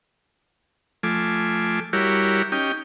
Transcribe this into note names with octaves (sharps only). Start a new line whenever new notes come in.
F3 A3 G#5 D6
G3 E4 F#4 G4 A#4 C#5
C#4 D#4 G4 G5